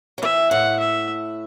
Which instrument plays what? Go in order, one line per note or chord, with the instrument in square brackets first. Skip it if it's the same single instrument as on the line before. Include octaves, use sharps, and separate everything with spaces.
[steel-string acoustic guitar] F#3
[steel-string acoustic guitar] E3 [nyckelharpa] E5
[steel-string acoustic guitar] A2 [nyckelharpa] F#5
[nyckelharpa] E5